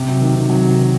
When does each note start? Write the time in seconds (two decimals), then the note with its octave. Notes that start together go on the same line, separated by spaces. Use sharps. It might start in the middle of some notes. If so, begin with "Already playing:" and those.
Already playing: C3
0.08 F#3
0.21 D#3
0.35 C3
0.50 F#3
0.64 C3
0.78 D#3